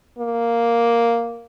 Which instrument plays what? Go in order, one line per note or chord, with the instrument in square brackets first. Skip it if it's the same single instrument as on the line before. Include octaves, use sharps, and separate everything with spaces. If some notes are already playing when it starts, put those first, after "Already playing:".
[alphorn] A#3